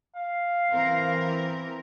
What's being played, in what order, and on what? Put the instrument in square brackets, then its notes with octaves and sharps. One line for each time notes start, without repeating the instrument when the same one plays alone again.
[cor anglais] F5
[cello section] E3 C4 A#4